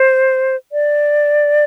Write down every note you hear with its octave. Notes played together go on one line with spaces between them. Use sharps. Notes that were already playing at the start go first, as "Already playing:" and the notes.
Already playing: C5
D5